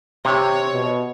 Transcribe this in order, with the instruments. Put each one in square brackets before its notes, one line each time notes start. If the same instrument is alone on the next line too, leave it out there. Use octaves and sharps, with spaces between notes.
[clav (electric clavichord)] C3 [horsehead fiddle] C#5
[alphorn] B2